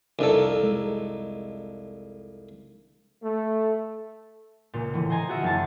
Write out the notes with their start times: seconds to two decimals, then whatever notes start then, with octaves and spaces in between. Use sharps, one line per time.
0.19 C2 F2 D4 D#4 A4 A#4
0.63 G#3
3.22 A3
4.73 C#2 A#2
4.93 A2 D3 E3
5.10 C5 D#5 G#5 A#5
5.28 F4 F#4 G#4 E5
5.42 F#1 D4 A5